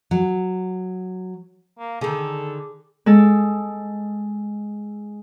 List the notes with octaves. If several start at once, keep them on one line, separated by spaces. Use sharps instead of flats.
F#3
A#3
D3 D#3 G#4 A4 G#5
G#3 A4